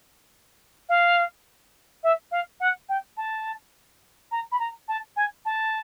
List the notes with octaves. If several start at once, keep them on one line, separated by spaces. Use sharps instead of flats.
F5
E5
F5
F#5
G5
A5
A#5
B5
A#5
A5
G#5
A5